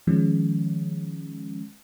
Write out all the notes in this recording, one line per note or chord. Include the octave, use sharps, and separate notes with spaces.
D#3 F3 G#3 C#4